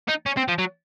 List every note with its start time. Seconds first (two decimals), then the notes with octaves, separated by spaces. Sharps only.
0.08 D#4
0.26 C#4
0.37 C4
0.48 F3
0.59 F#3